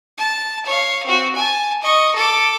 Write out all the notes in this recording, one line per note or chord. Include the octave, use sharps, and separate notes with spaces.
A5
C#5 F5
C4 F#4
G#5 A5
D#5 C#6
A4 D6